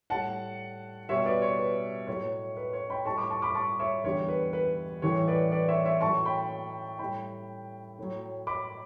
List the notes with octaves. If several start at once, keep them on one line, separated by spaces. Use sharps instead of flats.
A2 G3 F#5 A5
B2 G3 C#5 E5
B4 D5
C#5
B4
A2 F#3 C#5
B4
C#5
G5 B5
A2 G3 A5 C#6
B5 D6
A5 C#6
B5 D6
A5 C#6
C#5 E5
E2 D3 G3 C#5
B4
B4
A2 E3 G3 C#5
B4 D5
B4 D5
C#5 E5
C#5 E5
A2 F#3 A5 C#6
G5 B5
A2 G3 G5 B5
A2 F#3
B5 D6